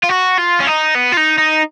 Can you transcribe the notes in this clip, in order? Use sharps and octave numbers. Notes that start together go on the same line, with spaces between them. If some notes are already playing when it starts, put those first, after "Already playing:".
F4
F#4
F4
C#4
D#4
B3
F4
D#4
D#4